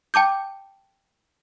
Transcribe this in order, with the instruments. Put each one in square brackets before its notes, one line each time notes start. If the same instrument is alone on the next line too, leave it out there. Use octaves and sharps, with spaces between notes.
[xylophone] G5 A5 D6 G6